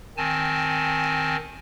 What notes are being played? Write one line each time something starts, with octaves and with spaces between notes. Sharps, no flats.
D#3 C4 G#5 A5